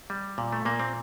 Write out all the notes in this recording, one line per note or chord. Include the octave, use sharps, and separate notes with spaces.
G3
A#2
A3
A#2 A#3
C4